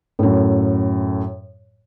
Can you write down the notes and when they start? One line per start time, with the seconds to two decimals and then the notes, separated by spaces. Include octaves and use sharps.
0.19 F#2 A2